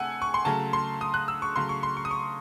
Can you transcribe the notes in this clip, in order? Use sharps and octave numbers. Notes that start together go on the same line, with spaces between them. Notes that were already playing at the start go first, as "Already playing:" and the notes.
Already playing: C3 A3 F#5 G#5 E6
C#6
C6
C#3 F#3 A3 A5
C6
D#6
F#6
E6
C#6
C#3 F#3 A3 C6
C#6
C6
C#6
D#6
C#6